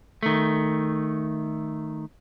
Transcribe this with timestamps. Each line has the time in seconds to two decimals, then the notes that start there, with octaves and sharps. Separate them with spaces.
0.23 D#3 A3